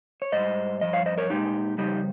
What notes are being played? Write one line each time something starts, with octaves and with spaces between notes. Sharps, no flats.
C#5
G#2 G3 C5 D#5
G2 F3 D#5
C#5 F5
C5 D#5
A#4 C#5
A#2 G#3 D#4 G4
F2 C#3 G3 D#4 G4